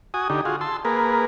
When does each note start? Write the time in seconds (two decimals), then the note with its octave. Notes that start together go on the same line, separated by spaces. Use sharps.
0.14 F#4 G#5 D#6
0.30 D3 D#4 G4
0.45 F4 F#4 G#4
0.61 A5 C6 E6
0.85 A#3 G#4 A#4 B4